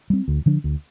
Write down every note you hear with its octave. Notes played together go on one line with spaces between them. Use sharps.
G3 C4
D2
D3 F3 D4
D2